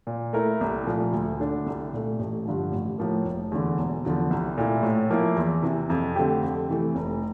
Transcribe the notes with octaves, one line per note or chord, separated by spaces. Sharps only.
A#2
A3 E4 A#4
C2
A#2 F3 A3
D2
D3 A3 D4
C2
A#2 A3
A1
G2 D3 F3
A1
A2 F3 A#3
F1
E2 D3
E1
E2 D3 F3
C2
A#2 A3 E4
A2
F3 A#3 E4
E2
C3 E3
F2
D3 A3 C4 G4
F2
C3 E3 A3
F1